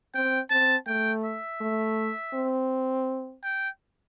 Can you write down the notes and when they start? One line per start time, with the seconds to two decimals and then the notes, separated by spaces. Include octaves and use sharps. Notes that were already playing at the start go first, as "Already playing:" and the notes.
0.15 C4 G5
0.50 C4 A5
0.87 A3 G5
1.24 E5
1.61 A3
2.34 C4
3.43 G5